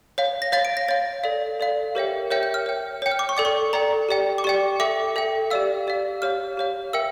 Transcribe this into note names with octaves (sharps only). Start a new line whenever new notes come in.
C#5 F5
A#6
C#5 F5 A6
D7
A#6
C#5 F5 A6
A4 D5 F5
A4 D5 F5
G4 A#4 C#5 E5 G5
G4 A#4 C#5 E5 G5 G6
G6
F6
C#5 G5
C#5 G5 G6
F6
D6
C#6
A4 D5 G5 D6
C#6
A4 D5 G5 A#5
G4 D5 G5
D6
G4 D5 G5 C#6
A4 E5 G5 D6
A4 E5 G5
G4 D5 F5 E6
G4 D5 F5
G4 C#5 F5 F6
G4 C#5 F5
A#4 E5 G5 E6